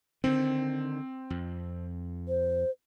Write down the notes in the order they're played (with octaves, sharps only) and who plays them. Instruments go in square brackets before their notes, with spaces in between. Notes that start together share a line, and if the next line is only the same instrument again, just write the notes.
[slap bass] D3 D#3 [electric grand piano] C4
[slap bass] F2
[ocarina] C5